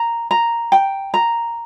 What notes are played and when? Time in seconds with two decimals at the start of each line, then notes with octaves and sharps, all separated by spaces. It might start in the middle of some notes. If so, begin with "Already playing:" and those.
Already playing: A#5
0.31 A#5
0.72 G5
1.14 A#5